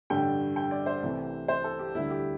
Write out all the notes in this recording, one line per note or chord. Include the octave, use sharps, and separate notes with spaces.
A1 G2 D3 G3 G5
G5
D5
C5
C2 C3 E3 A3
C5
A4
G4
D2 D3 G3 E4
G4